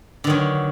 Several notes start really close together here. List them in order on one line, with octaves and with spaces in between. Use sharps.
D3 D#3 F#3